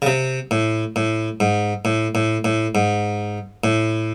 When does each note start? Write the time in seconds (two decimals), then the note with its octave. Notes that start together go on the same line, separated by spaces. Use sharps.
0.02 C#3
0.06 C3
0.51 A2
0.96 A2
1.40 G#2
1.85 A2
2.15 A2
2.45 A2
2.75 G#2
3.64 A2